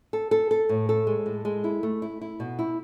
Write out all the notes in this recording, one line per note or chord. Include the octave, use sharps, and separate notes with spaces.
A4
A4
A4
A2
A4
G#3
A2
G#3
E4
A3
E4
E4
B2
E4